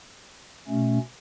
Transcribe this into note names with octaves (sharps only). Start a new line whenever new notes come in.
B2 A3 C#4